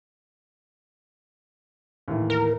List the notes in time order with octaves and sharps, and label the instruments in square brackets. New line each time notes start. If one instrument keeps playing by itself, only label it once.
[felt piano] D#2 A2 E3
[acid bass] A#4